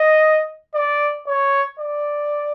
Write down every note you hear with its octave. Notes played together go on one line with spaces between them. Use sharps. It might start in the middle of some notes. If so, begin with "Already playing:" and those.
Already playing: D#5
D5
C#5
D5